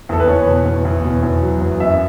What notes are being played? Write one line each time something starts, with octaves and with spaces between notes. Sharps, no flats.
E2 A4
B4
E2 C#5
B2
E2
E2
B2
E2
F#3
E2
F#2 E5